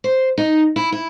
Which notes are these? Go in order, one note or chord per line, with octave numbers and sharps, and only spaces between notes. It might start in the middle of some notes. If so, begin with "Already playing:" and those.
C5
D#4
E4
E4